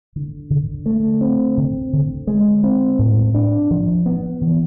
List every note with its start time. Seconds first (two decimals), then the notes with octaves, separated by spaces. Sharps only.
0.16 D3
0.50 D3
0.86 A3
1.21 C4
1.57 D3
1.93 D3
2.27 G#3
2.64 C4
2.99 A2
3.34 D4
3.71 F3
4.06 B3
4.41 E3